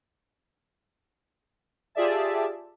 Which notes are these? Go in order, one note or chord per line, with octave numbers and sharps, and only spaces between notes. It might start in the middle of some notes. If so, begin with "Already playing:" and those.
F4 G4 G#4 D5 E5 A5